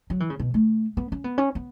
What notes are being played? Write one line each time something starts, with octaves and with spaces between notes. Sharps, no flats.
F#3
E3
C#3
B2
A3
B3
C#4
B3
C#4
B3